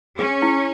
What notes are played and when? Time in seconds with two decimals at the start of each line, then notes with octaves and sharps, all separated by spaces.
0.19 C#4 G#4
0.42 E4